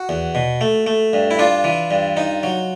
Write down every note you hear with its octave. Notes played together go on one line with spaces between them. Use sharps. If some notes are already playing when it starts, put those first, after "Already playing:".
Already playing: F#4
E2
B2
A3
A3
G2
E4
D4 F4
E3
G2
D#4
F#3